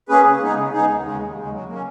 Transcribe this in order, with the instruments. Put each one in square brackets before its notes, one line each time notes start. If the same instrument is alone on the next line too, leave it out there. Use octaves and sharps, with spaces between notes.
[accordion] A#3 C#4 G#4 B4
C#3
G#3 B3 D#4 G#4
C#3
G#3 B3 D#4 G#4
D#2
C#3 G#3
D#2
C#3 G#3
F#3
A#3 C#4